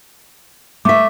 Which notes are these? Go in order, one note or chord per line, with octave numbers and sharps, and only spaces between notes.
A3 E5 D6 B6